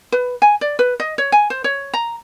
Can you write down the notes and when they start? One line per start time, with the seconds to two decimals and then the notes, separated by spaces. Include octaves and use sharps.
0.12 B4
0.42 G#5
0.61 D5
0.79 B4
1.00 D#5
1.18 C#5
1.32 G#5
1.50 C5
1.64 C#5
1.94 A#5